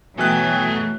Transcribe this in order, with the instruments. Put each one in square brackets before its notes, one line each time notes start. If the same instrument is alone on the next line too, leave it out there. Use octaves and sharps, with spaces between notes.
[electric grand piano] B2 F#6 [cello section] E3 F#3 A3 [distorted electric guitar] A4 G5 [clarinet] G#5